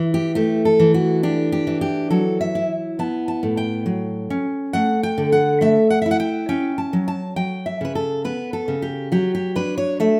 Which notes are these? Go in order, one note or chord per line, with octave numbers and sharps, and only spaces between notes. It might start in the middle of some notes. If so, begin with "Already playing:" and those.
Already playing: E3
G4
A3 G4
A4
E3
F#4
D4 G4
G4
E3
G4
F#3 A4
E5
E4
B3 A5
A5
A2
G5
F#3
C#4
A3 F#5
G5
D3
F#5
A3 E5
F#5
E5
E4
F#5
G5
C#4 G5
A5
F#3
A5
F#3 G5
E5
C#3 B4
A4
B3 B4
A4
C#3
G4
F#3 G4
G4
D4 B4
C#5
A3 E5